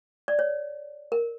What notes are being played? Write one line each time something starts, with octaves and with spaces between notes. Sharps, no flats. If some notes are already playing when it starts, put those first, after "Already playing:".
D5
C#5
A#4